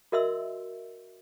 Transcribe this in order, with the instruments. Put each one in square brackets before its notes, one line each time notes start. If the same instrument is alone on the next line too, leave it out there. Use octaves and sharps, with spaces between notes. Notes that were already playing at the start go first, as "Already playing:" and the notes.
[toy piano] F#4 A#4 D#5 E5 C6 E6